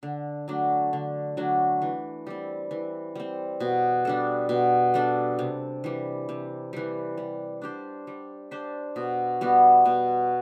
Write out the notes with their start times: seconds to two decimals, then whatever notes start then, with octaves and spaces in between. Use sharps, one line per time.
0.03 D3
0.48 F#3 A3 D4
0.93 D3
1.37 F#3 A3 D4
1.82 E3
2.27 G3 C4
2.71 E3
3.15 G3 C4
3.60 B2
4.05 G3 D4 A4
4.49 B2
4.94 G3 D4 A4
5.39 C3
5.84 E3 G3
6.29 C3
6.73 E3 G3
7.17 G3
7.62 D4 G4 C5
8.07 G3
8.51 D4 G4 C5
8.96 B2
9.41 G3 B3 F#4
9.85 B2